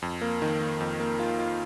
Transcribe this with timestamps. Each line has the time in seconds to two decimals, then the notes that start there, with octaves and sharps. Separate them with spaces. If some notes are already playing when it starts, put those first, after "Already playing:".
0.02 F2
0.21 A#3
0.42 D#3
0.61 A#3
0.80 F2
1.00 A#3
1.19 F4
1.39 F4